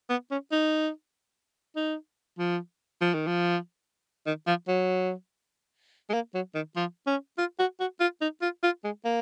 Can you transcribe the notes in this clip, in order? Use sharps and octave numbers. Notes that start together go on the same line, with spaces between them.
B3
C#4
D#4
D#4
F3
F3
D#3
F3
D#3
F3
F#3
G#3
A#3
F#3
D#3
F3
C#4
F4
F#4
F#4
F4
D#4
F4
F4
G#3
A#3